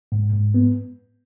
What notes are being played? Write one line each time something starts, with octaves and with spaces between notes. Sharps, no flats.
G#2
G#2
B3